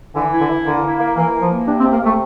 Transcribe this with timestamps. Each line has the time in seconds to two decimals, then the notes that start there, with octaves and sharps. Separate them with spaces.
0.15 D3 E3
0.32 E4
0.40 D3
0.49 E3
0.65 D3 A#3
0.83 E4
0.99 A#3
1.16 E3 A#3
1.33 E3
1.42 F3
1.51 A#3
1.67 C3 D4
1.80 C4
1.83 C3
1.93 A#3
2.01 C3
2.06 A3